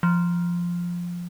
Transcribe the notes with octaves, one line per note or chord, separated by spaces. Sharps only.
F3